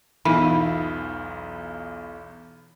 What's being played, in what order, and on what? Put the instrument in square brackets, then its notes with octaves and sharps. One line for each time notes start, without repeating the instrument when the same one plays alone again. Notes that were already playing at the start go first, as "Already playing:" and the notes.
[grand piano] B1 E2 F4 [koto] E3 [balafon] D#4